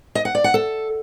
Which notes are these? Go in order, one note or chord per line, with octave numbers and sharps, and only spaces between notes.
D#5
F#5
D5
F#5
A4